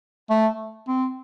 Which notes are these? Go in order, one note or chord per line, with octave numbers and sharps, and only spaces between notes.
A3
C4